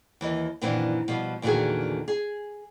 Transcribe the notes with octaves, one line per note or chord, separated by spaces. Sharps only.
D#2 E3 D#5
F#2 A#2 D#3 E3 C4 D4
B2 F3 G3
E2 A#2 D3 D#3 F#4 G#4
G#4